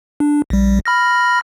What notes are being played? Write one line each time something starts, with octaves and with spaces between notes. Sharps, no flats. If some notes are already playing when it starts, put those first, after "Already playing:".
D4
A#1 G3
B5 F6 A#6